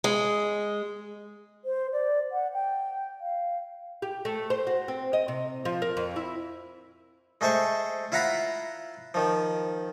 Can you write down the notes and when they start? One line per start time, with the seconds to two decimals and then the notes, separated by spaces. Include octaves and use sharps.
0.04 G#3
1.65 C5
1.93 D5
2.32 F#5
2.54 G5
3.21 F5
4.02 G4
4.25 A3
4.50 C5
4.67 F#4
4.88 C4
5.13 D#5
5.28 C3
5.65 F3
5.82 A#4
5.97 F2
6.16 E4
7.41 G#3 A3 G#4 C5 C#6
8.12 E4 F4 F5 F#5 A#5 B5
9.14 D#3 F3